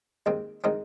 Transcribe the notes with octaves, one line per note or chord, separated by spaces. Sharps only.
D#2 D#3 G#3 C4
D#3 G#3 C4 D#4